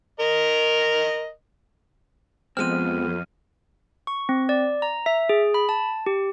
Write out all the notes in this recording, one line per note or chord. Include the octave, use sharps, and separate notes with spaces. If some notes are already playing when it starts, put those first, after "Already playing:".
A#4 D#5
F2 F3 G#3 B3 C4 F6 D#7
C#6
C4
D5
A#5
E5
G#4
B5
A5
G4